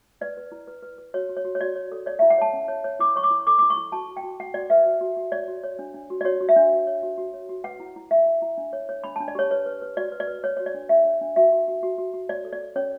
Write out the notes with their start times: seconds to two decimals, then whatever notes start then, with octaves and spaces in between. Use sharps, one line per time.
0.21 B4 D5
0.37 B4
0.52 E4
0.67 B4
0.82 B4
0.98 B4
1.14 F#4 C#5
1.29 F#4
1.37 C#5
1.45 F#4
1.55 C#5
1.61 F#4 D5
1.76 C#5
1.92 A4
2.06 C#5 D5
2.19 E4 E5
2.30 F#5
2.38 C#5 A5
2.53 C#4
2.68 C#5
2.84 C#5
2.99 E4 D6
3.16 C#5 C#6
3.23 D6
3.30 E4
3.47 A4 D6
3.58 E4 D6
3.70 C#6
3.77 E4
3.92 F#4 A5
4.08 F#4
4.17 G5
4.23 F#4
4.40 F#4 F#5
4.54 F#4 D5
4.70 B4 E5
4.85 F#4
5.01 F#4
5.17 F#4
5.32 C#5 D5
5.48 F#4
5.63 C#5
5.79 D4
5.94 D4
6.10 F#4
6.21 D5
6.25 F#4 C#5
6.41 F#4
6.49 E5
6.56 D4
6.72 F#4
6.87 C#5
7.03 F#4
7.18 F#4
7.34 C#5
7.49 F#4
7.64 B4 F#5
7.80 E4
7.96 E4
8.11 E4 E5
8.26 E4
8.42 E4
8.58 D4
8.73 C#5
8.89 C#5
9.04 D4 B5
9.16 D4 A5
9.28 D5
9.35 G4 C#5
9.51 B4 C#5
9.66 B4
9.82 B4
9.97 F#4 D5
10.12 B4
10.20 D5
10.27 B4
10.44 C#5
10.57 F#4 C#5
10.66 D5
10.74 D4
10.89 D4 E5
11.05 D4
11.21 D4
11.36 F#4 E5
11.53 F#4
11.68 F#4
11.83 F#4
11.98 F#4
12.14 F#4
12.29 C#5 D5
12.45 A4
12.52 D5
12.61 A4
12.76 C#4 C#5